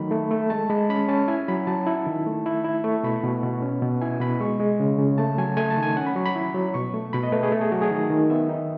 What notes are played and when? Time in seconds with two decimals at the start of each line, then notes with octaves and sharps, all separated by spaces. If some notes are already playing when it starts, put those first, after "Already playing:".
Already playing: D#3 F#3 A3 B5
0.11 A3
0.31 A3
0.50 G#3 A5
0.70 G#3 B5
0.89 C#4 B5
1.08 C#4 A5
1.28 E4 G#5
1.48 F#3 B5
1.67 F#3 A5
1.86 E4
2.07 D#3
2.26 A3
2.46 E4
2.64 E4
2.84 A3 C#6
3.03 B2 B5
3.24 B2
3.43 B2
3.62 C#4
3.82 B2
4.02 E4 G#5
4.20 B2 B5
4.40 G#3 C#6
4.60 G#3
4.80 C#3
4.99 C#3
5.18 A3 A5
5.38 F#3 G#5
5.57 A3 G#5
5.70 A5
5.77 D#3
5.83 G#5
5.96 C#4 F#5
6.06 B5
6.16 F#3 C#6
6.26 B5
6.36 E4
6.55 F#3
6.74 B2 C#6
6.93 A3
7.13 B2 B5
7.23 D#5
7.32 A3 B4
7.43 G#4
7.52 A3 A4
7.61 G#4
7.72 F#3 F#4
7.82 G#4
7.91 D#3
8.10 D#3
8.30 B3 E5
8.49 D#4